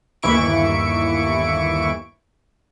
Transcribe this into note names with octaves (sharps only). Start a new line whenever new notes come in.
G1 D#2 E3 E4 C#6 D7